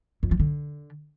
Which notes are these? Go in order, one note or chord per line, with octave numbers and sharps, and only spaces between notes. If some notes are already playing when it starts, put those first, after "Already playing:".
F2
F3
D3